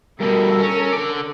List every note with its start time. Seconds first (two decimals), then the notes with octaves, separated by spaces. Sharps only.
0.21 G2 B2 A4 A#4
0.60 C#4
0.92 D3 D5